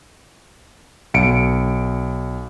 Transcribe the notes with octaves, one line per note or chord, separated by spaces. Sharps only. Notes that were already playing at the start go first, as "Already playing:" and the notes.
B1 C#7 D7